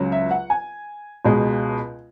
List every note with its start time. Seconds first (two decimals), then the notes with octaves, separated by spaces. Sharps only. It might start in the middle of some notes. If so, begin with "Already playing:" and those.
Already playing: C#2 C#3 F#3
0.12 E5
0.31 F#5
0.50 G#5
1.25 C#2 B2 G#3